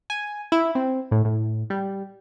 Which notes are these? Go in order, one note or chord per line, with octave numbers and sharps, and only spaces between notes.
G#5
E4
C4
A2
A2
G3